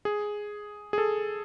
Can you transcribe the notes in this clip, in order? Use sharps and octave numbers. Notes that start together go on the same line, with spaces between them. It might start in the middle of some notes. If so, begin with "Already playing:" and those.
G#4
G#4
A4